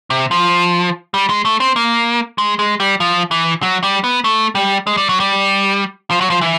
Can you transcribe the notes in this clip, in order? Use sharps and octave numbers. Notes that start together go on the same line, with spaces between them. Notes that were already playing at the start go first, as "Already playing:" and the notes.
C3
F3
G3
G#3
A3
C4
A#3
G#3
G#3
G3
F3
E3
F#3
G3
B3
A3
G3
G#3
G3
F#3
G3
F3
F#3
F3
E3